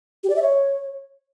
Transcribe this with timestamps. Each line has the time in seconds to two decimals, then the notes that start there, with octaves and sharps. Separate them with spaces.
0.24 G4
0.30 D5
0.36 E5
0.42 C#5